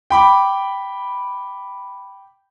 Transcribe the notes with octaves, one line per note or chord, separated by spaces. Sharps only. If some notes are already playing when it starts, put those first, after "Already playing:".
G5 B5 D6